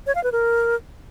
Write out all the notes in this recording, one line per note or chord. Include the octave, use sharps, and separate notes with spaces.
C#5
F5
B4
A#4